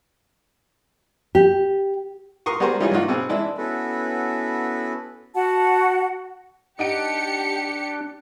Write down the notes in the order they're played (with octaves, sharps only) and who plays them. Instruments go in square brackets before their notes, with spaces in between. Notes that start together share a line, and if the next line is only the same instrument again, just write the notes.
[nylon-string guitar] G4
[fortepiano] A#4 C6 C#6 D#6
G3 B3 F#4 G#4 A#4 C5
E3 G3 C#4 D#4 F4 G#4
F#3 A#3 D#4 F4 F#4
B2 C4 G#4
E3 G#3 D4 E4
[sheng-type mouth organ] B3 C#4 E4 F#4 A4 B4
[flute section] F#4 F#5 A5
[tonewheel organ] D4 [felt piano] D#4 F#5 D7 [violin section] G4 C#7